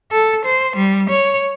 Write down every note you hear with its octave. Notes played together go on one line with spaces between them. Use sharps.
A4
C5
G3
C#5